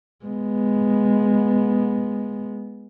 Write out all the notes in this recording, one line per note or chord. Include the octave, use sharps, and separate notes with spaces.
G#3 B3